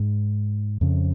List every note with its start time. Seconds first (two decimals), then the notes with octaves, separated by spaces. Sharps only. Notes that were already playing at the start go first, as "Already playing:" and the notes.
Already playing: G#2
0.81 F2 C#3